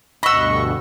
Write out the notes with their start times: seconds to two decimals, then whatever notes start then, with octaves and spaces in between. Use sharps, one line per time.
0.23 D2 G2 B2 D#5 F#5 B5 C#6 E6